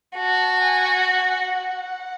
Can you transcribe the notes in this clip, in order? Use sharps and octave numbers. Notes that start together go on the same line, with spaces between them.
F#4 A5
G#5
F#5
F#5